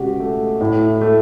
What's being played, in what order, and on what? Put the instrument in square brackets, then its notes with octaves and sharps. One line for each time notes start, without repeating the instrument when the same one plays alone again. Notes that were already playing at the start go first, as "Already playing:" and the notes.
Already playing: [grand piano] C#2 B2 [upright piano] C#4 F#4 G4
[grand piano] A3
[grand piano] A2 [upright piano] E4
[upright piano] E4
[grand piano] A3